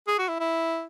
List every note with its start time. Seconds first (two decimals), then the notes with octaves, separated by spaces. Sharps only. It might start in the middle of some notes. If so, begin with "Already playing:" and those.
0.08 G#4
0.19 F#4
0.29 E4
0.40 E4